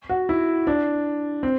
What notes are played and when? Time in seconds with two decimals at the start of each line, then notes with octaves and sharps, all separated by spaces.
0.09 F#4
0.29 E4
0.67 D4
1.43 C4